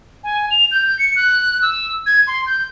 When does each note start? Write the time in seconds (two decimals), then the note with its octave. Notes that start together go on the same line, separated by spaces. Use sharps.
0.24 G#5
0.51 F7
0.71 G6
0.99 C#7
1.16 F#6
1.62 E6
2.06 G#6
2.27 C6
2.46 G6